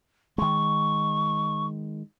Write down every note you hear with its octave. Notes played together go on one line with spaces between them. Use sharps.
D#3 G#3 C#6